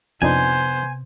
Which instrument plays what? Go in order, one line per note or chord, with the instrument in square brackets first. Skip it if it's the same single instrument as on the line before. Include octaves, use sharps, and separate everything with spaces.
[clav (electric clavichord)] F2 D4 D#4 [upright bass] C3 [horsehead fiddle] B3 C5 [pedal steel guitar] G#5